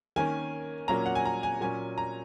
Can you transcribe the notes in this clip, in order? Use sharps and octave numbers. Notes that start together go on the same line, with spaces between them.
D#3 A#3 C#4 G#5
A#2 F#3 A#3 C#4 A#5
F#5
G#5
A#5
G#5
A#2 F#3 C#4 G#5
A#5